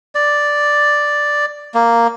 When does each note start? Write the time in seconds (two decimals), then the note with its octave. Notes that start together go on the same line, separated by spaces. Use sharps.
0.15 D5
1.74 A#3